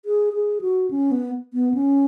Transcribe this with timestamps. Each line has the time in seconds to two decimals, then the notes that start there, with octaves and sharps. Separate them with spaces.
0.05 G#4
0.33 G#4
0.61 F#4
0.91 C#4
1.11 B3
1.53 B3
1.74 C#4